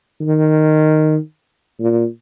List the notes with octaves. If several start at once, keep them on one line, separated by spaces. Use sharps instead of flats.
D#3
A#2